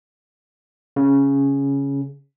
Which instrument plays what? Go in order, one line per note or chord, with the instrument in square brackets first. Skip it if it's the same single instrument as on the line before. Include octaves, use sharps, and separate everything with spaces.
[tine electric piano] C#3